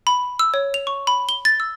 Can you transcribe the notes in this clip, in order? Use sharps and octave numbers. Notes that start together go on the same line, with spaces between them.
B5
E6
C#5
F7
C#6
B5
G7
A6
E6